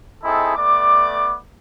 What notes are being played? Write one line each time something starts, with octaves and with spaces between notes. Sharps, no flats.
C4 D#4 E4 G#4 A4 D#5
A3 B3 D5 D6